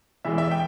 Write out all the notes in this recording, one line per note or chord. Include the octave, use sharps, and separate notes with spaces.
E1 E2 E3 G#3 E5
E5
G5